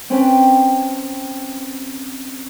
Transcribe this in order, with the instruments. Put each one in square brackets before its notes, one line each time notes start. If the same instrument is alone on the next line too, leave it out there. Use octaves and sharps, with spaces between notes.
[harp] C4 C#4 B4 G5 A5